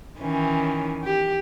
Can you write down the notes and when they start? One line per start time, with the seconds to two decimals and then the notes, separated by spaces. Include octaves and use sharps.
0.20 D#3 E3 C#4
1.04 G4